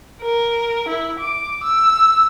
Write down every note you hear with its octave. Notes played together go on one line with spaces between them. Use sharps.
A#4
E4
D6
E6